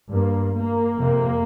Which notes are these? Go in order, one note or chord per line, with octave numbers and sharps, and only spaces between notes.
G2 A#3
A#3
F2 C3